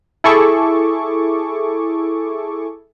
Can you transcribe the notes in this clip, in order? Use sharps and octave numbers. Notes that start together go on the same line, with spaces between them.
E4 G#4 A4 C#6 D6